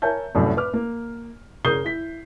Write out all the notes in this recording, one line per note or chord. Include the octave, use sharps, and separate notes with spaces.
A#4 C#5 E5 G#5 A5 G6
F1 C2 F#2 A2
B4 D6 F6
A#3
C#3 A#4 D#6 G6 C7 G7
E4 B6